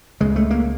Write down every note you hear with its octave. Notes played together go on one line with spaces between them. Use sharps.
C#2 C#3 G#3
A3
A#3